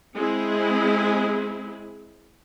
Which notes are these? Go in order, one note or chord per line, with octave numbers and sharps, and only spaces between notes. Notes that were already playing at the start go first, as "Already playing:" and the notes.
G#3 C4 E4 G#4